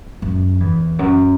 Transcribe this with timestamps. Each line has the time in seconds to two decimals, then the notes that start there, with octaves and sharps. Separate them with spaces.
0.22 F#2
0.60 E2
0.99 F#2